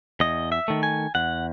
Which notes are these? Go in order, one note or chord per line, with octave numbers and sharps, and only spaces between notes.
E2 D#5
E5
D#3 A3
G#5
E2 F#5